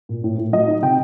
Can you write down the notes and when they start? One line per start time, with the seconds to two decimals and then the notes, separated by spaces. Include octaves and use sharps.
0.09 A#2
0.24 A2
0.38 A2
0.53 F#3 D#5
0.68 D#4
0.82 C3 G5